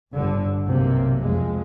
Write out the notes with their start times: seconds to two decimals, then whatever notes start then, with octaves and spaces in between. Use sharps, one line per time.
0.12 G1 D3
0.66 B1 C3 A#3
1.20 F2 G#3